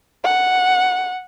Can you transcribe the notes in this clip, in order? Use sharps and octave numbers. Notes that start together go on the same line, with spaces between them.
F#5